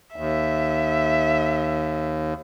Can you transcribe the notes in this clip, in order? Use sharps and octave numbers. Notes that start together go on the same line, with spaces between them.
D#2 E5